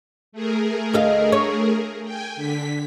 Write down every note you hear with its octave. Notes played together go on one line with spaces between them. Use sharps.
A3 G#4 A#4
D2 D#5 F5
C#5
G5 G#5
D3 B6